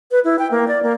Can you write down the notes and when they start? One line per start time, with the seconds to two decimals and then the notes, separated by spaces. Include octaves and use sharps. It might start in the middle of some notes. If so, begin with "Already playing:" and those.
0.11 B4
0.24 E4
0.39 G5
0.51 A#3
0.68 D5
0.83 A#3